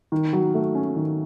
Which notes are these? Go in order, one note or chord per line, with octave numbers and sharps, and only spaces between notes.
D#3
F#3
A3
C#4
D#3